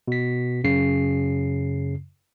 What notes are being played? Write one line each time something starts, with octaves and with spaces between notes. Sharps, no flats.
B2 B6
F#2 C#3 C7